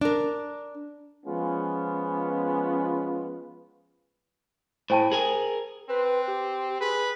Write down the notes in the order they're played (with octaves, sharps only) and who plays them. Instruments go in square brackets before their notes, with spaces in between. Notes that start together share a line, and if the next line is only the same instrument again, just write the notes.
[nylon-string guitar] D4 A#4
[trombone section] F3 G#3 B3 C#4 F4
[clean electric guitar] A2 [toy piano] C5 G5 A5
[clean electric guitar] G#4 A#4 G#5
[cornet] C4 [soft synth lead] B4
[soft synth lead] G4
[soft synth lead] G#4 [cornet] B4